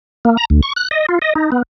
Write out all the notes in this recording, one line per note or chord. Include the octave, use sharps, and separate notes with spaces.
A#3
A#5
D2
C#6
F#6
D#5
F4
D#5
D#4
B3